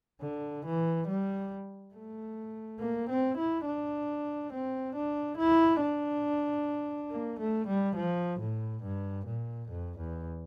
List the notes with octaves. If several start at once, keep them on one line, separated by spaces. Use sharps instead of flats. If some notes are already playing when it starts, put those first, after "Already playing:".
D3
E3
G3
A3
A#3
C4
E4
D4
C4
D4
E4
D4
A#3
A3
G3
F3
A2
G2
A#2
F2
E2